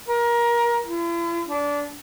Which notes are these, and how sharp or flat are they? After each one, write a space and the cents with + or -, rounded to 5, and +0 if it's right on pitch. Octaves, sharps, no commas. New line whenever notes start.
A#4 +25
E4 +45
D4 -20